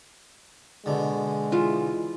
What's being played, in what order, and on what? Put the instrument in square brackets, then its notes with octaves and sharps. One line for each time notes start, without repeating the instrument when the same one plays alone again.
[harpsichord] B2 D3 [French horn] G#3
[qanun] E3 F4